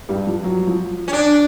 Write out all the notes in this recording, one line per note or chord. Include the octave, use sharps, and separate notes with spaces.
G2 G3
F3
F#3
F3
C#4
D4